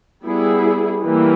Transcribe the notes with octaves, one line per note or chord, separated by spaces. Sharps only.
G3 B3 E4 G#4
E3 G3 A#3